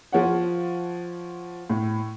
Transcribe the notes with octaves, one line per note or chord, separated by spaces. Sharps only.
F3 C#5 F#5
A2